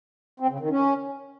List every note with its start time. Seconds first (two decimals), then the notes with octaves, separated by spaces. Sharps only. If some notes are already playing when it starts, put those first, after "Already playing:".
0.40 C4
0.50 C#3
0.60 D#3
0.70 C#4